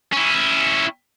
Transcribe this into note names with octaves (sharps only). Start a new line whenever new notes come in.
C#4 E4